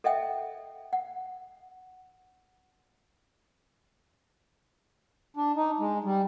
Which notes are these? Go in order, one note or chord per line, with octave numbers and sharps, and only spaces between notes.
A4 D#5 E5 F#5 G5
F#5
D4
D#4
G#3
G3